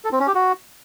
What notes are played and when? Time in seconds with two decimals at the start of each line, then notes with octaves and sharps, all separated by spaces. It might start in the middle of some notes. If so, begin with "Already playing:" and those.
0.05 A4
0.12 C4
0.20 C#4
0.27 G4
0.35 F#4